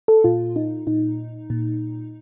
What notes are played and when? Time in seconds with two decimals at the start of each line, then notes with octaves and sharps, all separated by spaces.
0.08 A4
0.24 A#2 F4
0.56 D#4
0.87 A#2 D#4
1.50 A#2